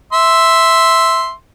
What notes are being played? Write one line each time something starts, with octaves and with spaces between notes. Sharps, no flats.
E5 C6